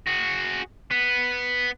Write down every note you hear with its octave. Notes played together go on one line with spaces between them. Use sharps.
F#4 G#4
B3